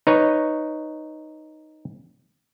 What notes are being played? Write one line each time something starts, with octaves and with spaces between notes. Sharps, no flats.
D#4 B4 C#5